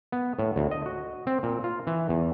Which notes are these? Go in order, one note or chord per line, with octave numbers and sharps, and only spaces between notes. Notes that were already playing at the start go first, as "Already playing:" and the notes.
B3
A2
D2
D#5
F#4
C4
A#2
F4
E3
E2